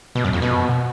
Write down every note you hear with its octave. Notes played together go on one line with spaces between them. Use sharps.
B2
F#2
F2
B2